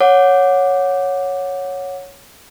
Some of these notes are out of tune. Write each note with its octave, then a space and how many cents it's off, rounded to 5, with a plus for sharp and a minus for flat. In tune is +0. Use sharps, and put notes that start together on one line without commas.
C#5 +0 F#5 -15 D6 +0